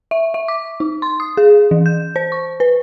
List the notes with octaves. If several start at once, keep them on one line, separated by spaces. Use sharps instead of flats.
E5
E5
D6
D#4
C6
D#6
G#4
E3
G6
C5
C#6
B4